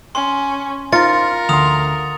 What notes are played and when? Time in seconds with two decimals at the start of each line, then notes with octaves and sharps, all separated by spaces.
0.15 C#4 C6
0.93 D#4 F4 A#4 C5 A6 C#7
1.49 D2 C6 D#6 F7